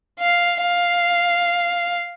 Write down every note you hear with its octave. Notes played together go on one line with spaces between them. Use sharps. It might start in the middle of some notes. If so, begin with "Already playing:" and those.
F5
F5